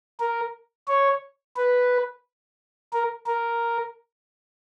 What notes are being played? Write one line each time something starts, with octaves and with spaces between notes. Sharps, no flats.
A#4
C#5
B4
A#4
A#4